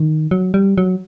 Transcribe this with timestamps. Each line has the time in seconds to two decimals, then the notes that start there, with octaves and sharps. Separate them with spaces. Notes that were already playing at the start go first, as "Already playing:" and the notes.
Already playing: D#3
0.31 F#3
0.54 G3
0.78 F#3